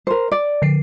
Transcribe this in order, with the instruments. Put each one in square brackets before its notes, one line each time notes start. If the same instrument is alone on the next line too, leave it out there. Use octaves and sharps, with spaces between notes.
[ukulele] A#4 C5
D5
[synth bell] D3 C7